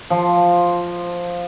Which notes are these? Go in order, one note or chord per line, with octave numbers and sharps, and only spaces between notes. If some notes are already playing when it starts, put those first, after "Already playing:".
F3